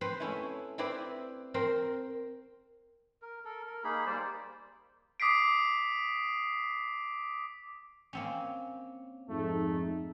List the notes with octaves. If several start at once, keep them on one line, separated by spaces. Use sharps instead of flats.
C4 B4 C5
A3 C#4 E4
C4 E4 B4 C5 D5
C4 A#4 C5 C6
A#4
A4 A#4
A#4
A#3 D#4 G#4 B5
G3 A#3 C5 D5
D6 D#6 B6 C7 D7
A#3 C4 C#4
F2 G#2 A3 D#4